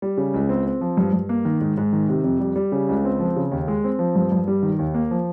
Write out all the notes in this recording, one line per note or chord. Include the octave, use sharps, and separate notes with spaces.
G3
C#3
C#2
C4
C4
F3
G2
G2
A#3
D#3
G#2
G#2
D#3
C3
F2
G3
G3
C#3
C#2
C4
F3
C#3
D#2
G#3
C4
F3
G2
G2
G3
D#3
D#2
A#3
F3